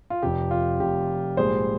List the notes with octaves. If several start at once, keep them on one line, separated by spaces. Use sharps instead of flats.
F4
F1 F2 C3 G4
F4
F1 F2 C3 G4
A#1 G#2 G3 A#3 G#4 C5